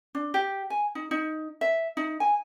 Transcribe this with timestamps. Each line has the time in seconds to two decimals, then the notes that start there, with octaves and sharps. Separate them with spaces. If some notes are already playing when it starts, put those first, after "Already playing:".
0.15 D4
0.34 G4
0.70 G#5
0.95 D#4
1.11 D#4
1.61 E5
1.97 D#4
2.20 G#5